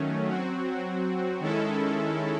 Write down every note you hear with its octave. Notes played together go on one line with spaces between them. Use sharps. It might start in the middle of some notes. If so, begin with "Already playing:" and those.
Already playing: D#3 F#3 A3 C#4
F#3 C4 F#4
D#3 G#3 C#4 E4 A4